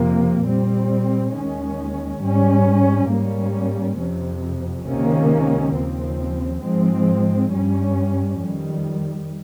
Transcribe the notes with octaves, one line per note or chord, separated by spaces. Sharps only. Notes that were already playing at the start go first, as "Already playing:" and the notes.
Already playing: F2 C3 F3 A#3
A#2 G3 C4
D#2 D#3 G#3 C#4
G#2 G3 C#4
G#2 G3 A#3 C#4
F2 C3 F3
C#2 C3 D#3 A#3 C#4
D#2 C#3 F3 C4
G#2 F3 G#3 C4
G2 G3 C#4
F2 D#3 G3